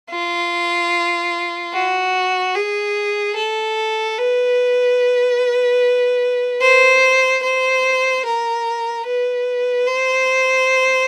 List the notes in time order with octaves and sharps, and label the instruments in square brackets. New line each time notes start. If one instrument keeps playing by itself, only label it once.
[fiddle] F4
F#4
G#4
A4
B4
C5
C5
A#4
B4
C5